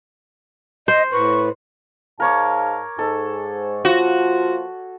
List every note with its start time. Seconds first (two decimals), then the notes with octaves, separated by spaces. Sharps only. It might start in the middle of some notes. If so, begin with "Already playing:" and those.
0.88 C5 D#5
1.12 A2 B4 C#6
2.20 G#2 A#4 C#5 F5 A5 D6
2.99 G#2 A4
3.85 F3 A#3 F4 F#4